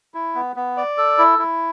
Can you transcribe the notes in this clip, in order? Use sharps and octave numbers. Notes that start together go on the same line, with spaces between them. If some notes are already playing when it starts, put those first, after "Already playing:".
E4
B3
B3
D5
A4
E4
E4